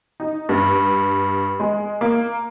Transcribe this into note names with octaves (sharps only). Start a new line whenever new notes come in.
D#4
G2
G#3
A#3